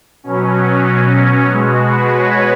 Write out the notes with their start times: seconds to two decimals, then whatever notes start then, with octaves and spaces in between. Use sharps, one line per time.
0.24 B2 F#3 C#4
1.20 C#4
1.51 B2 G#3 F#4
1.84 B4
2.16 C#5